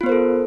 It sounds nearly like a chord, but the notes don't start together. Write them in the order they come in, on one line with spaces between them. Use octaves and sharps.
F4 B3 C5 A#4 A4